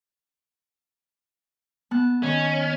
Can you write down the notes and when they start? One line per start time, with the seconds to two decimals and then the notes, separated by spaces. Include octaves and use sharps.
1.91 B3 A5 F#6
2.23 D#3 C#4